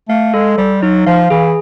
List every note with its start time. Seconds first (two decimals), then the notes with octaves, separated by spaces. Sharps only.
0.09 A3 F5
0.34 G#3 A4
0.58 G3 C5
0.82 F#3 D#4
1.06 F3 F5
1.30 E3 G#4